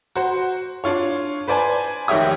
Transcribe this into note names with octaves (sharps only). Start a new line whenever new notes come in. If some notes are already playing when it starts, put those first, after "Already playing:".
F#4 C5
D4 F4 C#5
B4 C5 D5 G#5 A5
F1 D#3 G4 C#5 E5 D#6